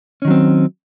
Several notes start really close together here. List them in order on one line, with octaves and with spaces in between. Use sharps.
C#4 D#3 F#3 C4